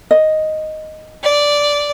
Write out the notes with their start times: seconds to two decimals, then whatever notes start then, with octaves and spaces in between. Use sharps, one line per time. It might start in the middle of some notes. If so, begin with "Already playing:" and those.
0.11 D#5
1.23 D5